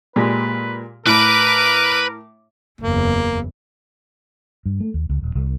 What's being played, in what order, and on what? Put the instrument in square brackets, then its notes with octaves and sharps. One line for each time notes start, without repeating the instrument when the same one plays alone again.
[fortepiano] A#2 G#3 G4 [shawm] B4
[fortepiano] A2 [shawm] A#4 [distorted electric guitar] B4 B5 [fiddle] D6
[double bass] F#1 E2 [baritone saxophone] A#3
[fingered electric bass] G2
A3
D#2
C#2
D#1
C2